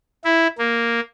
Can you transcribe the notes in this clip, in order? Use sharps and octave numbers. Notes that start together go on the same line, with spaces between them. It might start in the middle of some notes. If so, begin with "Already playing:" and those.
E4
A#3